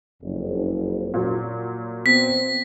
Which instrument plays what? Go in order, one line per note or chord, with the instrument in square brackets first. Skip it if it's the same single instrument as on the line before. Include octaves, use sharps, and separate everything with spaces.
[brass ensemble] F#1 F2
[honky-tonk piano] A#2 F#3
[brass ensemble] B3 C4 [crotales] B6